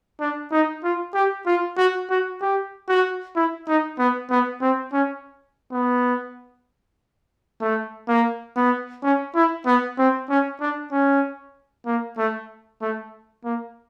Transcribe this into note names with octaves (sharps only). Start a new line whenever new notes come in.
D4
D#4
F4
G4
F4
F#4
F#4
G4
F#4
E4
D#4
B3
B3
C4
C#4
B3
A3
A#3
B3
C#4
E4
B3
C4
C#4
D4
C#4
A#3
A3
A3
A#3